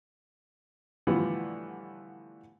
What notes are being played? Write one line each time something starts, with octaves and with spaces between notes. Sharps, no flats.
A2 D3 E3 F3 G3 B3